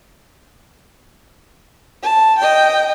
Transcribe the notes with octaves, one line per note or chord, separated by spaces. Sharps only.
A5
D#5 G5